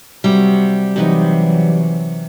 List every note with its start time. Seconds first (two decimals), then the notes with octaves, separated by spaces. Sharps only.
0.24 C3 F#3 G3
0.96 C3 E3 F#3 D#4 B4